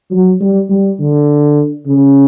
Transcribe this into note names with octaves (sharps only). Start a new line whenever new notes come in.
F#3
G3
G3
D3
C#3